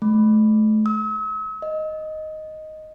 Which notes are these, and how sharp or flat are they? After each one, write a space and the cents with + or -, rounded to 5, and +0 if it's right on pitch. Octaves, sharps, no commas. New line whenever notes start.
A3 -30
E6 -45
D#5 +0